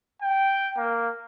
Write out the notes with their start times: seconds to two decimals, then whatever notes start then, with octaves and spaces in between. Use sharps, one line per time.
0.22 G5
0.77 A#3